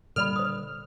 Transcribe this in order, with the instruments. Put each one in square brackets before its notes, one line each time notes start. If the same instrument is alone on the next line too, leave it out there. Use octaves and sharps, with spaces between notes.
[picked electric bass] A#2 D3 G3 [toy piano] A4 D5 B5 [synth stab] F6
[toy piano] C5 D#6